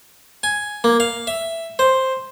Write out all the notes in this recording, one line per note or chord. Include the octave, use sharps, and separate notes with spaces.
G#5
A#3
F5
E5
C5